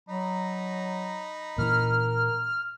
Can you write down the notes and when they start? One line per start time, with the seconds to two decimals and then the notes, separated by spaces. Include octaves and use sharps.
0.09 F#3 D#4 A#5 B5
1.58 A#2 E3 A#4 F6